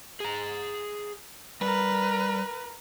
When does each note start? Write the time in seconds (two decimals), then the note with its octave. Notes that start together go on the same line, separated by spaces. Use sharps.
0.20 G#4 A#5
1.61 G3 A#4 B4